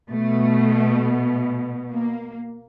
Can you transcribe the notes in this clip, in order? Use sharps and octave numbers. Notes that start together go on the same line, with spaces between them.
B2 A3
A#3